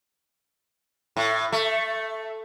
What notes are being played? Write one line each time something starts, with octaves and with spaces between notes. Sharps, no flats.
A2
A3